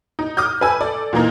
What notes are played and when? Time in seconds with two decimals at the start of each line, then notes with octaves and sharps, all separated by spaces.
0.19 D#4
0.37 D6 D#6 F6 G6
0.61 B4 G#5 E6
0.81 A4 D5
1.13 A#2 E3 A#3 D#4